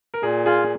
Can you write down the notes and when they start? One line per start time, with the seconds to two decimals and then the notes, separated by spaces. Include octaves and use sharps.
0.14 A#4
0.23 A#2 G#4
0.46 F4 G#4